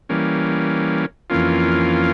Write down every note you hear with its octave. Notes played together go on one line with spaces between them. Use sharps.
E3 G3 A#3 C#4
F2 E3 A#3 C#4 F4